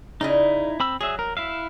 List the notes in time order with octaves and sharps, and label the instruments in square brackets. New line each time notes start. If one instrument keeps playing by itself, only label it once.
[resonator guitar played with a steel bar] C#3 D5 D#5 [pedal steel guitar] D#4 E4
[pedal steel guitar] C4 B5 E6
[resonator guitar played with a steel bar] F#3 [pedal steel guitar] G#4 E5
[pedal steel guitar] A#4
E4 E5 F5